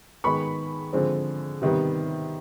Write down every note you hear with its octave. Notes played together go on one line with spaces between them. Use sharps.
D#3 G#3 B3 B5 C#6
D3 F3 G#3 C4
C3 D#3 G3 B3